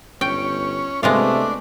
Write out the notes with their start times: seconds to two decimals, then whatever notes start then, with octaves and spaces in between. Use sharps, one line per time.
0.21 G1 C#4 G5
1.03 C3 G#3 A3 B3 D4 F4